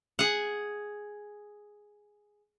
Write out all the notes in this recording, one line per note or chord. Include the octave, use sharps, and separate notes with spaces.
G#4 F#5